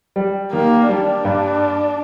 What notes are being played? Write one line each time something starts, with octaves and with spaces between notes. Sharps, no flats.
G3
D#3 A#3
G3 D4
G2